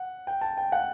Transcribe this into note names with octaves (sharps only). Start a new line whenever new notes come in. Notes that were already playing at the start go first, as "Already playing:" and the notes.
Already playing: F#5
G5
A5
G5
F#5